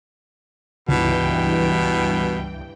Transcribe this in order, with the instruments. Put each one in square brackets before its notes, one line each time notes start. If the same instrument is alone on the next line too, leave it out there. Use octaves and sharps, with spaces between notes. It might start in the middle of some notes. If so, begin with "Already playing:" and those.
[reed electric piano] C#2 [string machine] G2 E3 G5 [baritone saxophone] B2